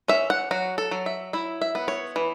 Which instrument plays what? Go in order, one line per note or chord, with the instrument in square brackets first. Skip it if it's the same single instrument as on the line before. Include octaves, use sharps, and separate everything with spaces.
[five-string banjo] C#4 E5
F#5
F#3 F#4
A4
F#3
E5
E4 E5
E5
B3
C#5
E3